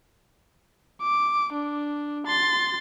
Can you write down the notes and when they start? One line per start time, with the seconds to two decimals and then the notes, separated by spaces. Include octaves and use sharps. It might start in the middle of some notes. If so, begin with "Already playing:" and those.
1.03 D6
1.53 D4
2.27 C6 A6